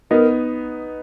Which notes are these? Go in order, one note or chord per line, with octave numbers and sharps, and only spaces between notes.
B3 D#4 A#4